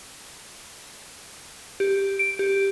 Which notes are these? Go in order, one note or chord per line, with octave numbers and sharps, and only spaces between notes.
G4
D7
G4